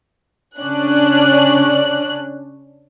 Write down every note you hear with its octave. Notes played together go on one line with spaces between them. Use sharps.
C#3 C#4 D4 F#6